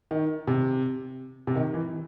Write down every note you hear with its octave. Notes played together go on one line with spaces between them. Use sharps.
D#3
C3
C3
D#3
E3